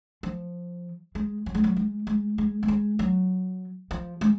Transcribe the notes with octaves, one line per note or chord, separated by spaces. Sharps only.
F3
G#3
F#3
G#3
F#3
G#3
G#3
G#3
A3
G#3
F#3
F3
G#3